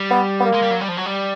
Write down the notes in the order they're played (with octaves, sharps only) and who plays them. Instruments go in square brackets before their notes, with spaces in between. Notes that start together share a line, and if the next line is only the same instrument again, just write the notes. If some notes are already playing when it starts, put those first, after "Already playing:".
Already playing: [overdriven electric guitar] G3
[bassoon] B3
B3
A#3
[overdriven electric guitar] G#3
G3
F#3
G3
F3
F#3
G3